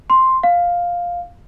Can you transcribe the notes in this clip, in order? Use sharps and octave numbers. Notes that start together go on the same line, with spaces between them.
C6
F5